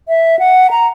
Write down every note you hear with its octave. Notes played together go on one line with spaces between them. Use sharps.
E5
F#5
A#5